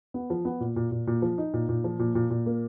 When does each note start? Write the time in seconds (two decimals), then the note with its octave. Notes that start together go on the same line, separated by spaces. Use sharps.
0.14 B3
0.30 F3
0.45 B3
0.60 A#2
0.76 A#2
0.91 A#2
1.07 A#2
1.22 F3
1.38 D#4
1.54 A#2
1.69 A#2
1.84 F3
1.99 A#2
2.15 A#2
2.30 A#2
2.46 A#3